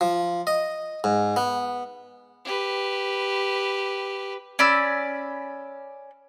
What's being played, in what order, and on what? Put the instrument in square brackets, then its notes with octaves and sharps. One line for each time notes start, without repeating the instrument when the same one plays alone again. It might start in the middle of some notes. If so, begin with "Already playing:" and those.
[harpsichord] F3
D#5
G#2
B3
[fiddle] G4 B4
[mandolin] C#4 D5 B5 E6